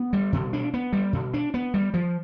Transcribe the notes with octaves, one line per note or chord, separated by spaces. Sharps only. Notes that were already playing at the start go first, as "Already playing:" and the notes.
Already playing: B3
G3
B2
D4
B3
G3
B2
D4
B3
G3
F3